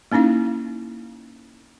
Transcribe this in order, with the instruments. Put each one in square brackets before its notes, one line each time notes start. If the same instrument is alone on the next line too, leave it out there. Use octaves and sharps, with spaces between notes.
[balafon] A#3 C#4 D#4 E4 F5